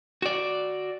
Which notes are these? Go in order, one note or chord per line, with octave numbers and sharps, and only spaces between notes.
F#4 D5